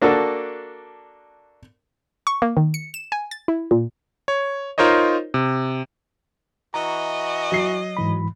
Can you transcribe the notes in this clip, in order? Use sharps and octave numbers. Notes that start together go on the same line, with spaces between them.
A#3 D4 F#4 A4
C#6
A#3
D#3
C#7
E7
G#5
A6
E4
A#2
C#5
D#4 F4 A#4 C5 C#5 D#5
C3
E3 F#4 D#5 A#5
F#3 C7
G#2 E3 B5